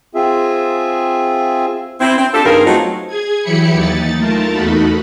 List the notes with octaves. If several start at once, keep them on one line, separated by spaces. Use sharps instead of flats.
C4 F4 G#4 E5
C4 E4
C4
D4 F4 G4 A4
G2 D#3 C4 G#4 A#4 F5
F#3 A3 B3 C4 D#4 F4
G#4 G#6
E3 F#3 E4 G4 B5 C#7
D#2 D#4 A6
A3 F4 A#4 A5
E2 D#4 F#4 A4 B5